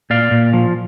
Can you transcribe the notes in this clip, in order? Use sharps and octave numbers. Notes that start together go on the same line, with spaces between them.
A#2 D5 F5
A#2
F3